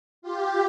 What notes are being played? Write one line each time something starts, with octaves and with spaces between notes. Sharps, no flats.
F4 G4